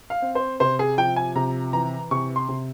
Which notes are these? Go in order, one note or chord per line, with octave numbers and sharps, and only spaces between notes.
F5
C4
C5
C3 C5
G#4
F3 G5
G#5
C3 A#5
E3 A#5
C3 C#6
C6
C3